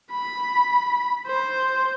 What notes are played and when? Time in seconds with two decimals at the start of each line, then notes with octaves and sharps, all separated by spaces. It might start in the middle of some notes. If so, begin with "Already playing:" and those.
0.11 B5
1.27 C5